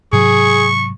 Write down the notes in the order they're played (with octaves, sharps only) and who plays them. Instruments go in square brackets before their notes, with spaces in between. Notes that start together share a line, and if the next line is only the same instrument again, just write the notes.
[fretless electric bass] G#2 C3 F#3 [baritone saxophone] G#4 [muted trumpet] C#6